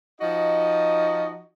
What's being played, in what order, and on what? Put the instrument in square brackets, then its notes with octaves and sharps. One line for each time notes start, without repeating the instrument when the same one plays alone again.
[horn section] F3 D#4 F#4 D#5